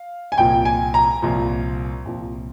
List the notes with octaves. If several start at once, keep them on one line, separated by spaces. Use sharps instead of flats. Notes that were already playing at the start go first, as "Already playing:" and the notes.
Already playing: F5
G#5
C2 A#2 F3 G5
G#5
A#5
C2 A#2 F3
C2 A#2 F3